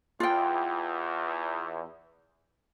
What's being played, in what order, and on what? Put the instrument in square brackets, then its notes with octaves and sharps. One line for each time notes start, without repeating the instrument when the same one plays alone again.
[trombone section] E2 [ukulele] F4 G5